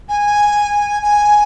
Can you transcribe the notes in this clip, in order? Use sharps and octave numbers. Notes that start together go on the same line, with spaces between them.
G#5
G#5